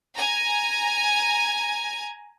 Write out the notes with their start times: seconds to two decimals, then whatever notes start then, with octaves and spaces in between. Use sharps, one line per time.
0.15 G#5 A#5